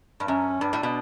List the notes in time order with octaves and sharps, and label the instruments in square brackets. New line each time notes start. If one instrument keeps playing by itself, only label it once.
[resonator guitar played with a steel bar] G2
[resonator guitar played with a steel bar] F#2 [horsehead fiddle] C#4
[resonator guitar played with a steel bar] G2 [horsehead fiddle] D4
[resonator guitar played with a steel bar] A2
B2